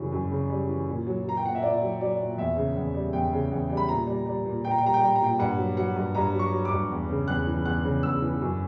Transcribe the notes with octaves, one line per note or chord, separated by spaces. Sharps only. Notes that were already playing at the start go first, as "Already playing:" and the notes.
Already playing: F#2 C#3 E3 G3
F#2
C#3
G3
E3
A#2
F#3
F#3 A#5
G5
A#2 F#5
E5
A#2 D5
F#3
F#3 D5
A#2
E2 E5
C#3
E2
G3
E2 G5
C#3
E2
G3
B5
A#2 A#5
G3
G3
A#2
A#2 G5
A#5
G5
G3 A#5
G5
G3 A#5
G5
A#5
A#2 G5
G2 F#5
F#3
F#3 F#5
G2
G2 A#5
F#3
C#6
F#3
D6
G2
E2
C#3
E2 F#6
E3
E2 F#6
C#3
E2 E6
E3
F#2